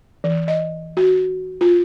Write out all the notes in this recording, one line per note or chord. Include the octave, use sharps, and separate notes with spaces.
E3
D#5
F#4
F4